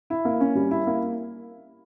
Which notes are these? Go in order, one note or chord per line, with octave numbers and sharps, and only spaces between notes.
E4
A#3
C#4
G3
E4
A#3